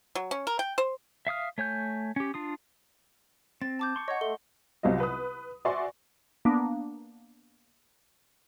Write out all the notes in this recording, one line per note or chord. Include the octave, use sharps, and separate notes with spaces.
F#3
C#4
A#4
G5
C5
E5 F5 D#6 F6
A3 C#5 G#5 G6
C#4 G4
D4 F4 D#6
C4 A6
A5 D6 G6
C6 C#6
C#5 D#5 F#5
A3 G7
C2 F#3 G3 F4 D#5
B4 D#6
F#4 D5 E5 G#5 C6 C#6
A#3 B3 D4